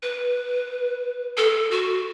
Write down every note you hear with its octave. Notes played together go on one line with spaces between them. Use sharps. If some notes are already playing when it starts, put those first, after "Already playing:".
B4
A4
F#4